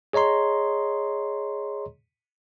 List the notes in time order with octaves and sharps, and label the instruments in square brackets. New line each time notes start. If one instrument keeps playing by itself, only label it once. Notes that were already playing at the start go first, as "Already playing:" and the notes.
[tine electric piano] G#4 C#5 D#5 A#5 C6